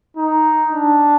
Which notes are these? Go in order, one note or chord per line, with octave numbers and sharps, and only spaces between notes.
D#4
D4